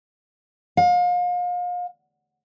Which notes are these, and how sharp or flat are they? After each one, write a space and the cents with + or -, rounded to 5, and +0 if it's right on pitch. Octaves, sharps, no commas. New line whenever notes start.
F5 +35